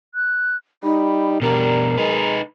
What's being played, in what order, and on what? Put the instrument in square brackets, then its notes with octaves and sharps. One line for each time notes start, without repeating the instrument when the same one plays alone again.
[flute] F#6
[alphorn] G3 [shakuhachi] D#4 [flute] B5
[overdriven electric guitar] B2 D4 [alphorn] G3 [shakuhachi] A#4 [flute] A#5
[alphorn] G#3 [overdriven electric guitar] D#4 B4